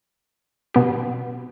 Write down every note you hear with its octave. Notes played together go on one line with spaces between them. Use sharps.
B2 B3 G4